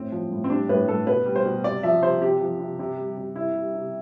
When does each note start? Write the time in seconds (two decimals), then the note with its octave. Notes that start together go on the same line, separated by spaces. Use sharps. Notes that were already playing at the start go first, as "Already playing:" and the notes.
Already playing: A2 C4
0.12 F3
0.31 A2
0.44 C4
0.50 G3 D4
0.69 A2 B4
0.88 A2 A4
1.07 B2 B4
1.26 G3
1.36 C5
1.45 B2
1.64 C3 D5
1.83 F3 E5
2.02 C3 C5
2.22 C3 G4
2.41 F3
2.60 C3
2.79 C3
2.98 G3
3.17 C3
3.36 C3 E4
3.55 G3
3.74 C3